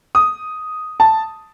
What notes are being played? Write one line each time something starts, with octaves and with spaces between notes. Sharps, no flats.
D#6
A5